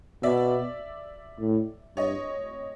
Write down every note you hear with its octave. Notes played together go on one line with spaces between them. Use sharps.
B2 D5 E5
A2
G2 C#5 D#5